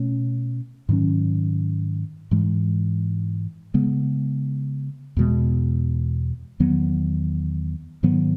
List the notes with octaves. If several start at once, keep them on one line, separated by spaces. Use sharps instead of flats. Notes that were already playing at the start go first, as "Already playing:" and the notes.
Already playing: B2 A3 C#4
G#2 D#3 F#3 C#4
G#2 E3 G#3
C#3 G#3 B3
E2 B2 G#3 B3
E2 D#3 F#3 B3
G#2 D#3 F#3 B3